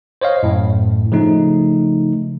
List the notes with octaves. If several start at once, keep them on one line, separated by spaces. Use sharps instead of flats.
C5 C#5 D#5 F5
F#2 A2
C#3 F3 A3 D#4